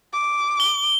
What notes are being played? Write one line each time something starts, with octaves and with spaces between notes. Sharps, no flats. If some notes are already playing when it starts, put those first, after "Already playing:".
D6
G7